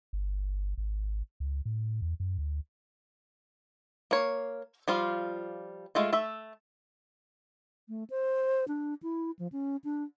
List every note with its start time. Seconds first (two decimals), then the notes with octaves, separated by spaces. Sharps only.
0.13 G1
0.78 G#1
1.40 C#2
1.65 A2
2.02 E2
2.20 F#2
2.38 D2
4.11 A#3 C#5
4.88 F3 G3 F4
5.95 G#3 A3 F4
6.13 A3 A4 E5
7.89 A3
8.10 C5
8.68 D4
9.03 E4
9.39 F3
9.52 C#4
9.84 D4